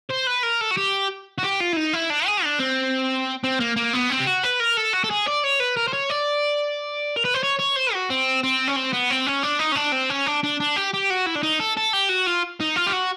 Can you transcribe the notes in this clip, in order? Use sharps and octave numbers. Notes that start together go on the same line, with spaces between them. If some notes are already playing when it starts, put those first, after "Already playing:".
C5
B4
A#4
A4
F#4
G4
F#4
G4
F4
E4
D#4
E4
D4
G#4
D4
C4
C4
A#3
A#3
B3
C4
G4
F#4
B4
A#4
A4
F#4
A4
G#4
D5
C#5
B4
A#4
C5
C#5
D5
A#4
B4
C5
C#5
C#5
C5
F#4
C4
C4
C#4
C4
B3
C4
C#4
D4
D#4
C#4
D4
C4
C#4
D4
D4
D4
G4
G4
F#4
E4
D4
D#4
A4
A4
G4
F#4
F4
D#4
F4
G4
F#4